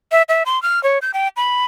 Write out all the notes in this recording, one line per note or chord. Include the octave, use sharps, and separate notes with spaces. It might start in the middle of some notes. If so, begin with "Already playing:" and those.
E5
E5
C6
F6
C#5
G6
G5
B5